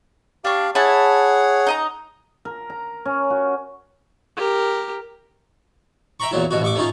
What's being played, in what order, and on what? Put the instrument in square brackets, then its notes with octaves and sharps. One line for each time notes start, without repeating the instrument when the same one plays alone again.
[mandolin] D4 C#6 [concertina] G4 F5
[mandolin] E4 A5 [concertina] G#4 C#5 F#5
[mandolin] D#4 D#5 A#5
[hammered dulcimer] A#4
A#5
C#4
F#4
[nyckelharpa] G4 A#4
[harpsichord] E5 G5 A#5 B5 C#6
E2 A#2 F#3 E4
A1 B2 F#4
A1 C#6 D6
A3 C#4 D#4 F4